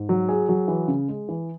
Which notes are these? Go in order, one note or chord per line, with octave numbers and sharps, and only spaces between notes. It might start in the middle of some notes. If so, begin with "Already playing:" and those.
Already playing: G#2
F#3
G#4
F#3
E3
C#3
G#3
E3